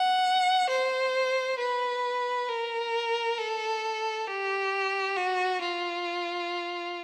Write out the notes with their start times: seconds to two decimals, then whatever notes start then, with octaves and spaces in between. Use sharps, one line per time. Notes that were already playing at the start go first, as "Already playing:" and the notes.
Already playing: F#5
0.69 C5
1.59 B4
2.48 A#4
3.38 A4
4.27 G4
5.17 F#4
5.61 F4